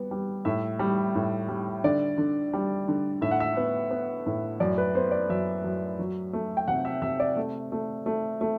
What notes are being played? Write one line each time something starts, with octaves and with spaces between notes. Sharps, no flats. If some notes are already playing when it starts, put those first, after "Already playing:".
Already playing: G3 B3
G3
A2 E5
G3
A2
G3
D3 D5
D3
G3
D3
A2 E5
F#5
E5
B3
B3
A2
F#2 D5
B4
B3 C5
D5
F#2 E5
F#2
F#3
A3
G5
C3 F#5
E5
C3 E5
D5
A3
A3
A3
A3